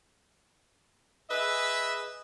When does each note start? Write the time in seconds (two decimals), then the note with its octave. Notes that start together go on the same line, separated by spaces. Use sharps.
1.30 G#4 B4 D#5 E5